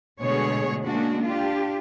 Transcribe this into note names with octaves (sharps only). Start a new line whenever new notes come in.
B2 D3 G#3 A3 G#4 C#5
G#3 A#3 C#4 D4 F#4
D4 F4 G4